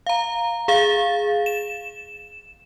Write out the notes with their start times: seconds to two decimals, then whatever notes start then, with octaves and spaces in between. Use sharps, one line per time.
0.07 F5 A#5
0.68 G#4 F5 A6
1.46 E7